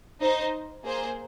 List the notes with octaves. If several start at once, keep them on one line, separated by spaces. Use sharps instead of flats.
D#4 C5 D#5
A#3 G#4 C5